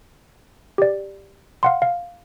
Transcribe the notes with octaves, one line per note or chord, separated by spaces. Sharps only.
G4 D5
F5 F#5 C6
F5